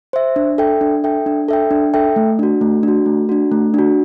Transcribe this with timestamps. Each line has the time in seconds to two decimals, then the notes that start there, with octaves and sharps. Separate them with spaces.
0.13 C5 E5
0.36 D4
0.58 A4 E5 G5
0.81 D4
1.04 A4 E5 G5
1.26 D4
1.48 A4 E5 G5
1.71 D4
1.94 A4 E5 G5
2.16 A3
2.39 D4 F#4
2.61 A3
2.83 D4 F#4
3.06 A3
3.29 D4 F#4
3.52 A3
3.74 D4 F#4